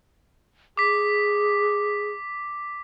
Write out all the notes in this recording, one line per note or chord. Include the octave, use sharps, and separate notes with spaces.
G#4 D6 B6